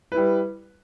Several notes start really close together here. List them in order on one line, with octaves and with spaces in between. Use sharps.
B4 E4 G3